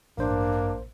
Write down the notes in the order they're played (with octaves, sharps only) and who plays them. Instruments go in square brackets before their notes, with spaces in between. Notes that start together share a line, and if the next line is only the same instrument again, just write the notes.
[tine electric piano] A1 C5 [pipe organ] G2 [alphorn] A#3 [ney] D4